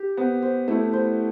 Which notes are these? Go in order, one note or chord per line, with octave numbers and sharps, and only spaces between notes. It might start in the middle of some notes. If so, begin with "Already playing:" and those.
Already playing: G4
B3 C5
C5
A3 E4
C5